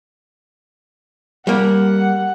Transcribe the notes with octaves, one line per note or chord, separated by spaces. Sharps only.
G3 A#3 F#5